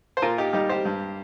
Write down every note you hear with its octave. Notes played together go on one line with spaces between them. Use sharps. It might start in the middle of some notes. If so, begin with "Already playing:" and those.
C5
A#2 F4 A#4
D#4 G4
G3 D#4 G4
G4 C5
G2